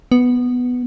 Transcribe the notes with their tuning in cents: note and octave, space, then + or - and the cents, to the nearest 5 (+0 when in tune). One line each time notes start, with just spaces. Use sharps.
B3 +5